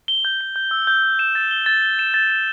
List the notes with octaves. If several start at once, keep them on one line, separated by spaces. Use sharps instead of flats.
G7
G6
G6
G6
E6
G6
E6
E7
A6
G7
A6
G7
E7
A6
E7